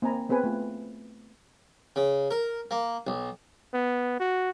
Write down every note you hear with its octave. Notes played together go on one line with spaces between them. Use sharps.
A#3 C4 G#5 A#5 B5
B3 C4 G#4 B4 G#5
A3 F4
C#3
A#4
A#3
B1
B3
F#4